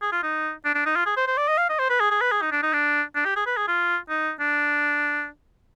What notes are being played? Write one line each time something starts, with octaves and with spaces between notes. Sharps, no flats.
G#4
F4
D#4
D4
D4
D#4
F4
G#4
C5
C5
D5
D#5
F5
D#5
C5
B4
G#4
G#4
B4
G#4
D#4
D4
D#4
D4
D4
G4
G#4
B4
G#4
F4
D#4
D4